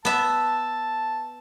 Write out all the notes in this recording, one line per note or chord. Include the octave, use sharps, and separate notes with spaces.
B3 E5 A5